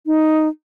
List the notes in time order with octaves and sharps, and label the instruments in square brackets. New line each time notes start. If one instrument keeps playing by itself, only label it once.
[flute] D#4